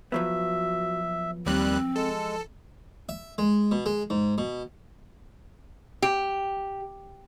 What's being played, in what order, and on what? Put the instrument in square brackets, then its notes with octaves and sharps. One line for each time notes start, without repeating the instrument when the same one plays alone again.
[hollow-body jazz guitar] F3 F#3 B3 [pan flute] F#4 [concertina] E5
[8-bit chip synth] D#2 G3 F#6 [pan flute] C4
[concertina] G#3 [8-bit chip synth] A4
[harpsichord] E5
G#3
B2
G#3
G#2
B2
[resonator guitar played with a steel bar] G4